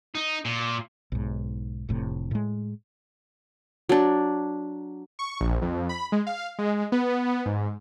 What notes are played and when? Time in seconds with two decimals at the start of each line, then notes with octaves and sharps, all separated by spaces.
0.15 D#4
0.45 A#2
1.12 B1 G#2
1.89 F1 A2 C3
2.31 A2 G#3
3.89 F#3 D4
5.19 C#6
5.41 A#1
5.62 F2
5.89 B5
6.12 G#3
6.27 F5
6.59 G#3
6.92 B3
7.46 G#2